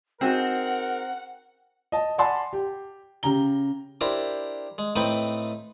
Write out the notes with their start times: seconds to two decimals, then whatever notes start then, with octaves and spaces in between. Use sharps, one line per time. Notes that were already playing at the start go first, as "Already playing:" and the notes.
0.21 C4 D#4 F#4 G#4 A#4 F#5
1.92 D#5 A5
2.18 D5 F#5 G#5 A5 B5 C6
2.53 G4
3.23 C#3 G4 A#5 G7
4.01 D4 E4 G4 A#4 C5 A#5
4.78 G#3
4.96 A2 A3 C4 D#4 B4 G5